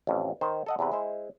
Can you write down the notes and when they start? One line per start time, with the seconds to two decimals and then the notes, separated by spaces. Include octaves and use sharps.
0.07 A1 F2
0.41 D#3 C5
0.66 A4 D#5 F#5
0.79 E2 C3 B4
0.92 G#3 E4 C5